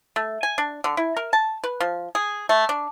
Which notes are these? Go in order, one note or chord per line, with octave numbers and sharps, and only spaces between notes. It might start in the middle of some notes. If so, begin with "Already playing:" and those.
A3
G#5
D4
D3
E4
A#4
A5
B4
F3
G#4
A3
D4